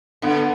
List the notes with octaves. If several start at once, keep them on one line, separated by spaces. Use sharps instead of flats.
D3 B3